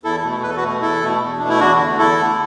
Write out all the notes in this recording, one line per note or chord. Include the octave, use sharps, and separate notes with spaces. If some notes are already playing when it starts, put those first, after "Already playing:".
E2 E4 A4
B2 A3
E2 B4
A4
F#4 B4
B2 A3
E2 E4 A4
B2 A3
E2
B2 A3 D4
E4
E2 D4 F#4
D3 A3
E2 E4 A4
D3 A3